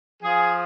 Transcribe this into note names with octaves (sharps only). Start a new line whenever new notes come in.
F3 G#4